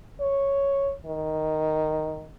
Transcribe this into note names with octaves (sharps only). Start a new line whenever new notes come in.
C#5
D#3